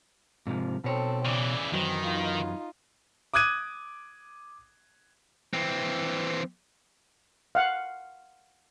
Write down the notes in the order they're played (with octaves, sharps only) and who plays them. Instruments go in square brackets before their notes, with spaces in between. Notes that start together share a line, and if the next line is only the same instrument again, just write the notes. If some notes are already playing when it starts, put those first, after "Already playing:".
[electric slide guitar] G#2 C3 F3
[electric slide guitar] B2 C#5 [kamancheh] C4 A4
[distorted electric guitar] C#3 E3 [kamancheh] D5
[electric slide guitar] F#2 E3 F#3 [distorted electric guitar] D#3 [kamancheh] C4
[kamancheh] D#4 F4
[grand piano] D6 D#6 F#6 G#6 D#7
[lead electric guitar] E3 C4
[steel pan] F5 F#5